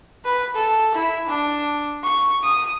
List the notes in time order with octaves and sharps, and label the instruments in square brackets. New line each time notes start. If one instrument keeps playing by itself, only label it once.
[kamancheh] B4
A4
E4
D4
C#6
D#6